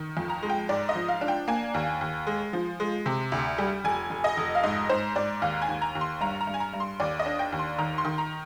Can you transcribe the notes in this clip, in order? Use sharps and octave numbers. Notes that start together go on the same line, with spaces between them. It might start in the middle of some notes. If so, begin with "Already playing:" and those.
Already playing: D#3
F2
A#5
G#3
G5
G#2 D5
D#5
F3
F5
D4
G5
A#3 G#5
D#2
D#2
G#3
F3
G#3
C3
D2
G3
F1 G#5
F1
D#5
F1
F5
G#2 D#5
G#2 C5
G#2 D5
D#2 F5
G#5
D#2
A#5
D#2
C6
G2 A#5
A#5
G2
G#5
A#5
G2
C6
D#2 D5
D#5
D4
G5
D#2
C6
D#3 A#5
C6
D#3
A#5